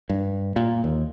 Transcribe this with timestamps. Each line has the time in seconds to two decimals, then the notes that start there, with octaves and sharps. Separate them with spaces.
0.10 G2
0.56 A#2
0.84 D#2